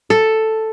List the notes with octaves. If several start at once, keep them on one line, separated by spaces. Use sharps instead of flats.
A4